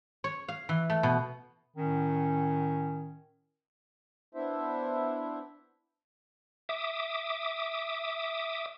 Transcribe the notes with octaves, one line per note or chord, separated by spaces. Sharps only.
C#5
F5
E3
A3
B2
A2 D#3 C#4
B3 D4 E4 C5 E5
E5 D6 D#6